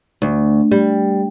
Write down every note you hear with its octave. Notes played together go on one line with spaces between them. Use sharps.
D2
G3